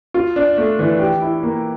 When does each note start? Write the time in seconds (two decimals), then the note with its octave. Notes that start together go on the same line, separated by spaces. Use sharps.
0.14 F4
0.36 D4
0.58 A3
0.79 E3
0.99 G4
1.21 E4
1.43 A#3